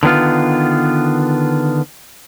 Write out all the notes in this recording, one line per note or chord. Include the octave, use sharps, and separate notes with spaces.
D3 D#3 B3 F4